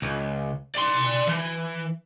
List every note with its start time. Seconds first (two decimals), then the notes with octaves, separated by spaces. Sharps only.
0.02 C#2
0.75 D5 C6
1.27 E3